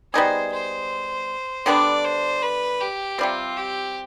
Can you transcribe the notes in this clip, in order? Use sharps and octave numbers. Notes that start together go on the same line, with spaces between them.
G3 B3 D#4 G#4 C5
C5
D3 G3 B3 D4 D5
C5
B4
G4
C3 G3 C4 F4
G4